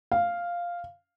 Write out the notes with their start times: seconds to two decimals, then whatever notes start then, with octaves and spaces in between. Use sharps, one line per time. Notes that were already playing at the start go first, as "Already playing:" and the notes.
0.12 F5